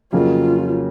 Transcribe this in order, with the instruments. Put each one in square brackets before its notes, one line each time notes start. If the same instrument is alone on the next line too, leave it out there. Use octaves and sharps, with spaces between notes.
[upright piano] F2 C#3 F#3 A#3 C#4 [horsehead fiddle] F4